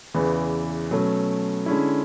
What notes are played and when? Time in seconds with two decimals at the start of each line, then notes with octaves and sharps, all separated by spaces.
0.14 E2 C#3 E3
0.91 B2 F#3 A3 C#4
1.66 D3 G#3 C#4 E4